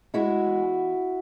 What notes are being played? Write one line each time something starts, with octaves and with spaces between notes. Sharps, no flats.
G#3 E4 F#4
E2